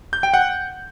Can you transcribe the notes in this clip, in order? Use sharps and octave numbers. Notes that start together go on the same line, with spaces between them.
G6
G5
F#5